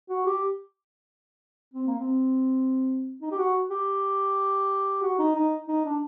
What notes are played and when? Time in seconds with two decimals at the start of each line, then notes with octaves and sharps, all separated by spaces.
0.10 F#4
0.26 G4
1.74 C4
1.87 A#3
2.00 C4
3.22 D#4
3.31 G4
3.38 F#4
3.71 G4
5.03 F#4
5.19 D#4
5.36 D#4
5.68 D#4
5.85 D4